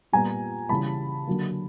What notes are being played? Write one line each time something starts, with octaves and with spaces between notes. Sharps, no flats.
A#2 G3 B3 G#5 A#5
C#3 E3 G3 A5 B5
D3 F#3 A#3